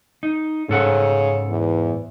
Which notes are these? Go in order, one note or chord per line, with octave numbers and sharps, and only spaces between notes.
D#4
G#2 C#3 A4 F#5
E2